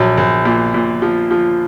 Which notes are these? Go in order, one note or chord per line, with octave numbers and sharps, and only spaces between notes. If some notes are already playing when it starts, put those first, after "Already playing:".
Already playing: A#1 F#3
A#1
A#2
A#2
F3
F3